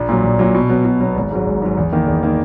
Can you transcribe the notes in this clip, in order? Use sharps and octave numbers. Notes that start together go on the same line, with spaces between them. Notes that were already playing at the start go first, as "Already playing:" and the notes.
Already playing: A#1
A#2 F#3
A#1
A#2 F#3
B2
F#3 B3
B2
F#3 B3
G#1
G#2 F#3
G#1
G#2 F#3
E2
D#3 A#3
E2
D#3 A#3